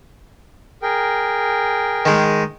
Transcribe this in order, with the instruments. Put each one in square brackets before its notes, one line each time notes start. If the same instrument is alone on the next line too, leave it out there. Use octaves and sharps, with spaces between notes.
[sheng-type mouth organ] G#4 A#4 G5
[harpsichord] D#3 G#3